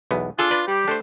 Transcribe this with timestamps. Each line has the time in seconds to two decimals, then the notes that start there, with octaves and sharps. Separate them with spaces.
0.11 B1 E2 B3
0.39 D4 F4 G#4 A4
0.51 B4 D5
0.68 G3 G4
0.88 A3 D4 C5